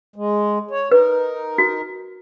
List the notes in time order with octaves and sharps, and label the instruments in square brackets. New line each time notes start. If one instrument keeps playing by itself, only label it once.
[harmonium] G#3
C#5
[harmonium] D#4 A#4 [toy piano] B4
[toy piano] F#4